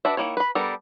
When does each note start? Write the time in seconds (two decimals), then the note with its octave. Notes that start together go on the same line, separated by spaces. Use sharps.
0.05 D4 F#4 B4 D5 E5
0.17 D#3 F#3 A#3 E4 C#5
0.37 B4 B5
0.55 G3 B3 D4 A4 A#4